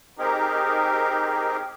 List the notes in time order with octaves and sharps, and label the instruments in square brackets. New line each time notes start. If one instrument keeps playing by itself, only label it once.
[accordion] C4 D#4 G4 G#4 A#4